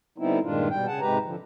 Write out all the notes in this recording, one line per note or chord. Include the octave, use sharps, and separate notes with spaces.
D3 G3 B3 C4 D#4 E4
G2 A#2 D#3 G#3 D4 F4
B2 G3 G5
C#3 G#4 F#5 A5
G#2 C3 G#3 G4 B4 A#5
D3 F3